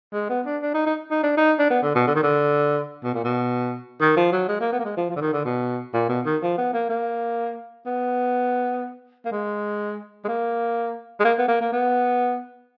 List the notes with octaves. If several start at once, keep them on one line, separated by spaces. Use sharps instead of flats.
G#3
B3
D4
D4
D#4
D#4
D#4
D4
D#4
D4
B3
D3
B2
D3
D#3
D3
B2
A#2
B2
D#3
F3
F#3
G#3
A#3
B3
A#3
G#3
F3
F3
D3
D#3
D3
B2
A#2
B2
D#3
F3
B3
A#3
A#3
B3
A#3
G#3
G#3
A#3
G#3
A#3
B3
A#3
A#3
B3